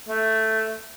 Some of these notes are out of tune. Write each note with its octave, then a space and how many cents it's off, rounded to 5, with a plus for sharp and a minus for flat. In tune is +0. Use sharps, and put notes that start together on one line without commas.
A3 +5